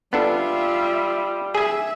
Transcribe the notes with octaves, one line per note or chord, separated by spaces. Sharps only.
G3 B3 D4 F4 A4 E5
G#4 E5 G#5